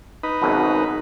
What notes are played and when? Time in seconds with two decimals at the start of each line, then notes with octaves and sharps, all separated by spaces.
0.23 D#4 B4
0.42 G#1 F#2 B2